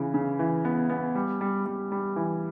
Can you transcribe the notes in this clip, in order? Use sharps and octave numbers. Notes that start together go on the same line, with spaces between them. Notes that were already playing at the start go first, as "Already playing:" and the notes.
Already playing: C#3 E3
C#3
E3
B3
B3
G3
G3
G3
G3
E3